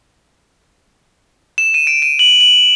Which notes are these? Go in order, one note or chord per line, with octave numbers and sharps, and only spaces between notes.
E7
D#7
D7
D#7
F#7
F#7